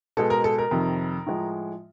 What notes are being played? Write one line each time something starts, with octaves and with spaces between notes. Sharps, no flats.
B2 G#3 A4
A#4
A4
A#4
F2 C3 D#3
A2 F3 G#3